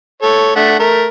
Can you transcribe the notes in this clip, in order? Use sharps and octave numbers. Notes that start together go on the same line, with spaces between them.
A4 C#5
A3 D4 F#5
A3 A#4